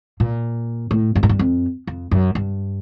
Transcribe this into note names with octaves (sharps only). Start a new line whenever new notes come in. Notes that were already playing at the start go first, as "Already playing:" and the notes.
A#2
A2
G2
G#2
G2
F2
F2
F#2
G2